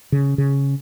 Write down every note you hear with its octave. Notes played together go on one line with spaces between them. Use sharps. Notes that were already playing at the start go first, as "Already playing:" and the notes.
C#3
C#3